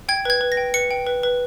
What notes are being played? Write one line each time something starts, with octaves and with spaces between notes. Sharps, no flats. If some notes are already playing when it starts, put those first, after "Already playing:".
G5 G#6
B4 G#6
B4
A#6
G5
B4 C#7
G5
B4
B4